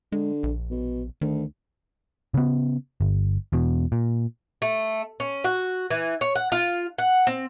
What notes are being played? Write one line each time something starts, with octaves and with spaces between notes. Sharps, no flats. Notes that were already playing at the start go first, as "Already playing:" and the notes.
D3 G#3
A#1
B2
D2 D#3
C#3 B3
G1
E2 B2
A#2
A3
C#4
F#4
E3
C#5
F#5
F4
F#5
C4